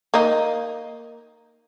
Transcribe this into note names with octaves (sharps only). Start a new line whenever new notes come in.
A#3 D#4